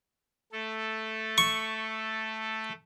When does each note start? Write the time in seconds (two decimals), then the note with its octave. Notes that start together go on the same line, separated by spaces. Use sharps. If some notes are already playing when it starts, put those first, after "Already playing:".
0.52 A3 A4
1.38 C#6